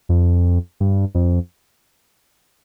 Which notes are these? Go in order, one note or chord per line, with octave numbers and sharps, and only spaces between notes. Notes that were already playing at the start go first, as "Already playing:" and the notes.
F2
G2
F2